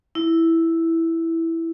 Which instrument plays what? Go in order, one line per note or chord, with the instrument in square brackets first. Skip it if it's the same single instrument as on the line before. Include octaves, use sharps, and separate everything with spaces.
[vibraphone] E4